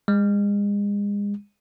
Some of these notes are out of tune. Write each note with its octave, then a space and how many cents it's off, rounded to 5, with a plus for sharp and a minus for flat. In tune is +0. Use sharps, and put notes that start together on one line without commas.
G#3 -35